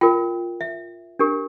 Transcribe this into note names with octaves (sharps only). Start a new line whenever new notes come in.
F4 A#4 G5
E5
D4 G4 A#4